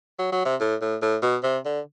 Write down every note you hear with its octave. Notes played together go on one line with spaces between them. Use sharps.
F#3
F#3
C3
A2
A2
A2
B2
C3
D3